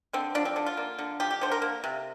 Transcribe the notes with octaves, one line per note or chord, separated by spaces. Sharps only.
D3 C4
F3 D4
C4
D3 D4
F4
A#3
D3
F3 G4
G4
D3 C5
A#4
A#3
C3